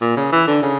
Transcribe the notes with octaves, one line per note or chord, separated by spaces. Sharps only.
A#2
C#3
E3
D3
C#3